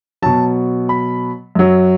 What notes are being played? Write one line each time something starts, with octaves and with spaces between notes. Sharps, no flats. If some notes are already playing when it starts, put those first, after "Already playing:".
B2 F#3 A5
B5
F#2 F#3